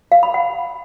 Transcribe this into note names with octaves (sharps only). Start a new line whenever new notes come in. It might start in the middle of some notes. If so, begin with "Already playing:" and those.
F5
B5
F#5